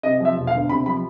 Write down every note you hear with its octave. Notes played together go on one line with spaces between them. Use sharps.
C3 D#5
F3 E5
E1
F5
D2
C3 B5
F3 B5